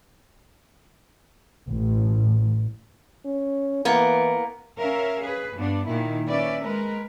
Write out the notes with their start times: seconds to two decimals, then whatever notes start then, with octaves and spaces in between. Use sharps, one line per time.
1.69 A1
3.25 C#4
3.85 E3 A#3 B3
4.79 C#4 A#4 E5 F5
5.24 G#4 B4
5.55 G2 B3 D4
5.87 A#2 D#3 E4
6.26 C#4 B4 D5 E5
6.62 G#3 A#4 B4